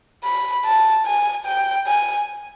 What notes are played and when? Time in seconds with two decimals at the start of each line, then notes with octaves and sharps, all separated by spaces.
0.24 B5
0.65 A5
1.06 G#5
1.46 G5
1.87 G#5